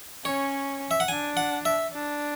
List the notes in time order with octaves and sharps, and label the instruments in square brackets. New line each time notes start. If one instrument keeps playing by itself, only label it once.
[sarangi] C#4 [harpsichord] C#5
[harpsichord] E5
F#5
[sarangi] D4 [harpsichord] G#5
[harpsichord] F#5
E5
[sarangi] D4